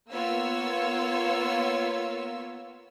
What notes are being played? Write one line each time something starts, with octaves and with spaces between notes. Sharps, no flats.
A#3 B3 F4 C#5 E6